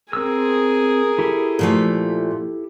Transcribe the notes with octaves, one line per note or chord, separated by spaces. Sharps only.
C4 G#4 A#4 E6
E4 G4 A4
A#2 F3 A3